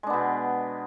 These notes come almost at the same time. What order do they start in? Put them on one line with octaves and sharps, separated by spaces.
G#3 D4 B3 B2